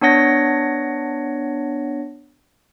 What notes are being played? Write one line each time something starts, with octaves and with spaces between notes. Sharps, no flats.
B3 D4 C#5 F#5 A#6